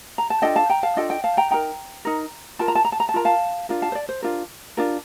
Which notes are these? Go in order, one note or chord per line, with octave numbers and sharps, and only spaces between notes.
A#5
A5
D4 F4 A4 D#5 G5
F5 A5
G5 A#5
F5 A5
D4 F4 A4 D#5 G5
D#5 G5
F5 A5
G5 A#5
D#4 A#4 G5 A#5
D#4 A#4
F4 A#4 A5
A#5
A5
A#5
A5
A#5
A5
F4 A#4 A#5
F5 A5
D4 F4 A#4
F5 A5
C5
D5
C5
D4 F4 A#4
D4 F4 A#4